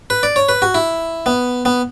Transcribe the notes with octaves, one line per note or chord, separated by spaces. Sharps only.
B4
D5
C#5
B4
F#4
E4
B3
B3